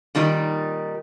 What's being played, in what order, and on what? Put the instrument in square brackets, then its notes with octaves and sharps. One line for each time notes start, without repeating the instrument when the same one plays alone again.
[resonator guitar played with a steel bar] A#2 D#3 G3 D#4